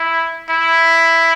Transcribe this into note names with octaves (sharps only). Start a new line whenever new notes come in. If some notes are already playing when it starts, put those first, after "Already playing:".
Already playing: E4
E4